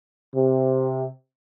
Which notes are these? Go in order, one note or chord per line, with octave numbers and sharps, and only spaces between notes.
C3